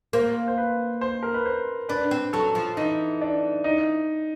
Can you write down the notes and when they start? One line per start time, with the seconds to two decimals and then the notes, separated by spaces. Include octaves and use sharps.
0.13 A#3 C5
0.48 C5
0.58 B4
1.01 C5
1.23 A#4
1.34 B4
1.46 C5
1.89 D4 B4
2.11 C4
2.33 F#3 A4
2.55 F3
2.77 E3 D#4
3.21 D4
3.64 D#4